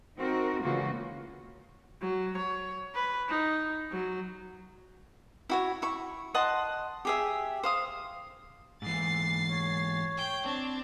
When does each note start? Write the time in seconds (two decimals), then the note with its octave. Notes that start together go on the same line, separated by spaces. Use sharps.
0.18 C4 D#4 F#4 A#4
0.63 C#3 E3 G#3 A#3 F4 F#4
2.01 F#3
2.37 C#5
2.95 B4
3.29 D#4
3.92 F#3
5.50 E4 F#4 C#5
5.82 E4 C#6
6.34 D#5 F#5 A5 C6
7.05 G4 G#4 E5
7.63 C5 F5 D#6
8.82 G#2 E3 A6 C7
9.50 C#5
10.17 G5
10.46 C4 D4